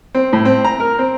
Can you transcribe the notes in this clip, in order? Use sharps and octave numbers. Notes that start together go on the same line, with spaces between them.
C4
A2
C4
A#5
A#4
C4